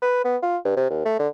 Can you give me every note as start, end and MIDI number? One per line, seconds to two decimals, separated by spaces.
0.02 0.22 71
0.24 0.37 59
0.42 0.58 65
0.65 0.74 43
0.77 0.88 48
0.90 1.01 39
1.05 1.19 57
1.19 1.28 50